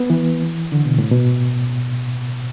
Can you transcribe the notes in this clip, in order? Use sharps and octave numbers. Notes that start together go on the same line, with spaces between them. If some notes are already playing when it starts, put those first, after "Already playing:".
Already playing: B3
E3
D3
B2
A2
B2